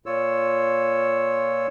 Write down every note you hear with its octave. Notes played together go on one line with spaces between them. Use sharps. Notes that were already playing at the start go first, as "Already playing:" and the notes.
A#2 F4 C#5 E6